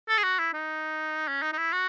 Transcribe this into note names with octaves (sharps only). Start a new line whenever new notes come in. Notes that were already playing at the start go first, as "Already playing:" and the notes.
A4
G#4
F#4
E4
D#4
C#4
D#4
D#4
E4
F#4